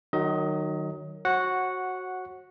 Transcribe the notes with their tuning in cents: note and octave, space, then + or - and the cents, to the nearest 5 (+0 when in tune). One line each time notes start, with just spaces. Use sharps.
D#3 -25 F#3 +10 D#5 +25
F#4 +0 C#5 -45 F#5 -10